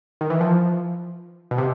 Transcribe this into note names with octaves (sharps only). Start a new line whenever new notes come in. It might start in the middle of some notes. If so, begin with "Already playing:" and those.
D#3
E3
F3
B2
C3